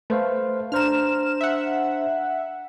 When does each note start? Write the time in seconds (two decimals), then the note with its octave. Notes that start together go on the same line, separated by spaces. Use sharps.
0.10 A3 B4 C5 F5
0.72 D4 C5 A#5 F6 E7
1.41 E5 F#5